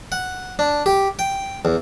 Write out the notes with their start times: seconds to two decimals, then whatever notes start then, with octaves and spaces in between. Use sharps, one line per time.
0.12 F#5
0.59 D4
0.86 G4
1.19 G5
1.65 E2